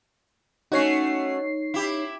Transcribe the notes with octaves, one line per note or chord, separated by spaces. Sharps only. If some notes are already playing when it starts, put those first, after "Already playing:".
A3 C#4 D#4 F#4 C#5 C7
E4 G4